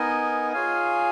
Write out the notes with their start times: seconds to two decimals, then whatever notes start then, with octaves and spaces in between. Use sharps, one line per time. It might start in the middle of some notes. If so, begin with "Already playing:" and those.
Already playing: B3 D#4 A#4 D#5 G#5
0.52 F4 G#4 C#5 F5 G#5